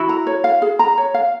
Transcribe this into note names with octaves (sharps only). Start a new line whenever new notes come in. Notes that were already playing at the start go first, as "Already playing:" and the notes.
Already playing: E4 F#4
A#5
C#5
F5
G#4
A#5
C#5
F5